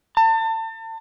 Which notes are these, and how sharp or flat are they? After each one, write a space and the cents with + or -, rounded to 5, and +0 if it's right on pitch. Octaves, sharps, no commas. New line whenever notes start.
A5 +35